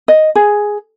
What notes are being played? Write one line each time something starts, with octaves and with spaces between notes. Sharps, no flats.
D#5
G#4